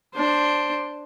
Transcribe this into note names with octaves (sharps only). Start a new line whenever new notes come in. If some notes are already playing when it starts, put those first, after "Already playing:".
D4 C5